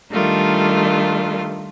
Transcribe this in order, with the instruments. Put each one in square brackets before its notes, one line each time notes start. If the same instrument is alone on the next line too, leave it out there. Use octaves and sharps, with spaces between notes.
[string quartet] D#3 G3 A3 D4 F4